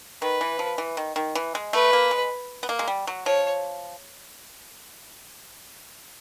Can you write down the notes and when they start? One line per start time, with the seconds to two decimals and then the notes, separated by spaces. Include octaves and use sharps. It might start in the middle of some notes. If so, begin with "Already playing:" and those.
0.22 D#3 B4
0.41 E3
0.59 F3
0.78 E3
0.97 D#3
1.16 D#3
1.35 E3
1.55 G#3
1.73 A3 B4
1.93 A#3
2.11 G#3
2.63 B3
2.69 A#3
2.79 G#3
2.87 G3
3.07 F#3
3.25 F3 C#5